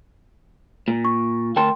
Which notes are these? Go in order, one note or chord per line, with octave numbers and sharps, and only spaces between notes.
A#2
C#6
D2 A#4 G5 A5 C6